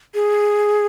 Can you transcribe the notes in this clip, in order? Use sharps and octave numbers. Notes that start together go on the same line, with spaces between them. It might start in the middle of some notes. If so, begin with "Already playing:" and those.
G#4